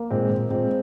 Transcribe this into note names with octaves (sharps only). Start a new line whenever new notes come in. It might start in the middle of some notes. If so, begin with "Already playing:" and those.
Already playing: A#3
A#2 G#3 C4
A#2
A#2 G#3 C4